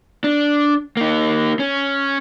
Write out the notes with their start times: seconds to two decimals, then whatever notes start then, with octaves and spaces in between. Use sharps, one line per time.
0.24 D4
0.97 A#3 D#4
1.59 C#4